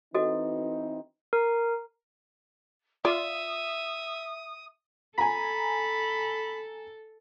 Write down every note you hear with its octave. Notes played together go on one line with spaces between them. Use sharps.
E3 C4 D#4 F#4 A4 D#5
A#4
F4 D5 E5 D#6
A4 G#5 A#5 B5